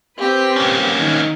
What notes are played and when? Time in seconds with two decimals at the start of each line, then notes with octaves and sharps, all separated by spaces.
0.18 C4 G4 B4
0.56 A#3 C#4
0.96 D#3